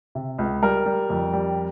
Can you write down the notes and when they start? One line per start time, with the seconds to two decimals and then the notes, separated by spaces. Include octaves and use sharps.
0.15 C3
0.38 C#2
0.62 G3 A#4
0.86 G3
1.10 F2
1.33 G3